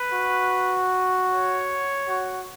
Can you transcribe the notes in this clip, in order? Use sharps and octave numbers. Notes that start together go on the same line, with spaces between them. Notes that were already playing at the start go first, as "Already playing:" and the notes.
Already playing: B4
F#4
C#5
F#4